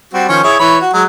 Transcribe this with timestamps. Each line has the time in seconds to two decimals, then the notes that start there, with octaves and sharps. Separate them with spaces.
0.14 G3 C4 F#4
0.29 D#3 F3 C#4
0.44 E4 G#4 C#5
0.59 E3 C#5 B5
0.81 F#4
0.93 F#3 G#3